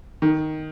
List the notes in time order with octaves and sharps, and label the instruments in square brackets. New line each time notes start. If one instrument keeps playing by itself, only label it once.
[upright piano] D#3